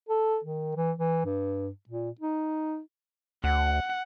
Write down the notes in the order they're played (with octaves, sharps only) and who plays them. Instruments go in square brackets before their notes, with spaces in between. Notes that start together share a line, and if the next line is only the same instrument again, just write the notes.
[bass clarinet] A4
D#3
E3
E3
G2
A#2
D#4
[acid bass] D2 [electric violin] F#5